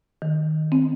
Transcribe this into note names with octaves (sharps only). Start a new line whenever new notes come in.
D#3
C4